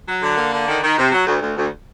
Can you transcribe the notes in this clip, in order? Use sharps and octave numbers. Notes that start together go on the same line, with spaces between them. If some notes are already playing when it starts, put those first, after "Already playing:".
F#3
D3
A#3
D3
D#3
D#3
C3
F#3
D2
D2
D2